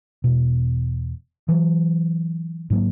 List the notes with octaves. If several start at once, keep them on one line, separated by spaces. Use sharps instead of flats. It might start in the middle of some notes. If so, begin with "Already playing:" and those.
E1 B2
E3 F#3
G#2 F#3 A#3